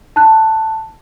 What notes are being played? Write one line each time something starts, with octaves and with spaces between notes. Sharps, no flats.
A5 F#6